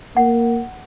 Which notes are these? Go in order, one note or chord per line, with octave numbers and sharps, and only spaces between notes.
A#3 F#5